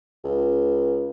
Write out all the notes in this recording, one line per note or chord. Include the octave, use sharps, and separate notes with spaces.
C#2